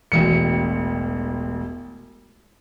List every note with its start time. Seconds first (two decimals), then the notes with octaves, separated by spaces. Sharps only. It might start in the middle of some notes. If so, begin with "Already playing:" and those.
0.12 E1 A1 C#7